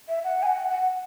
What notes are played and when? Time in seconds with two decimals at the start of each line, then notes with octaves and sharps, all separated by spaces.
0.09 E5
0.24 F#5
0.43 G#5
0.47 F#5
0.70 F#5